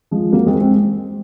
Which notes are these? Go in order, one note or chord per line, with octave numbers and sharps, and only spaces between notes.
F3 G#3
F#3 A#3
G#3 C4
G#3 C4